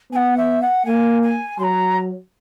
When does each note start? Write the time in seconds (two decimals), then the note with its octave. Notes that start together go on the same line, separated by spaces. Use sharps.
0.12 B3 G#5
0.16 F#5
0.37 E5
0.62 F#5
0.86 A#3 G#5
1.22 G#5
1.59 F#3 A#5 C6